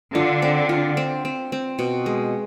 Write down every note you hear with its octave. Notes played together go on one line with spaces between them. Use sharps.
D3 F4
C4
F4
C4
C4
C4
B2
G#3